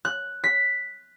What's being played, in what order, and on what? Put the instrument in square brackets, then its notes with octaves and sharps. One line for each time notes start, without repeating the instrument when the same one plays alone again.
[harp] F#6
B6